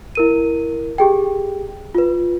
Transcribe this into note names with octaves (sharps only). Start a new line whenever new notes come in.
E4 A#4 D#7
G4 G#4 G5
F4 B4